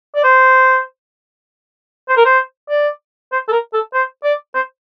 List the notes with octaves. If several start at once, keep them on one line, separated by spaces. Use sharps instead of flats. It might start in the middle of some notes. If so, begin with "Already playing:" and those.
D5
C5
C5
A#4
C5
D5
C5
A4
A#4
A4
C5
D5
C5